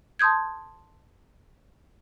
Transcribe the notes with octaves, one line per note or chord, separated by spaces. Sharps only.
A5 C6 D#6 G6 G#6